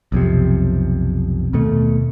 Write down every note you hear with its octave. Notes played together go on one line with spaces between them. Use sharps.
B1 F2 C3
D#2 B2 A3